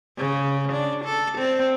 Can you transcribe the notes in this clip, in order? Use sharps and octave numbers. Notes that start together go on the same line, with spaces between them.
C#3
D4
A4
C4